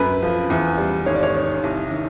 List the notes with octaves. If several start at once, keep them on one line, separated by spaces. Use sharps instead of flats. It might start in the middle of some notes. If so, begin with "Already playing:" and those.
Already playing: F#2 B4
F3
E2
G3
G#1 C#5
D5
C#5
D#3
C2
D#3